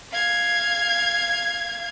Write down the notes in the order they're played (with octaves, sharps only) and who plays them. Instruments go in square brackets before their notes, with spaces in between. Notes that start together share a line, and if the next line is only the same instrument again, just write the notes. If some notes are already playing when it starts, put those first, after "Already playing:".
[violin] F5 G#6